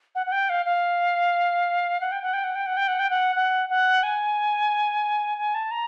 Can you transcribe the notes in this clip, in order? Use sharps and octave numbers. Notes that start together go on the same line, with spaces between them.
F#5
F#5
G5
F5
F5
F#5
G5
F#5
G5
F#5
G5
F#5
G5
F#5
G5
F#5
F#5
F#5
G#5
G#5
A5
A#5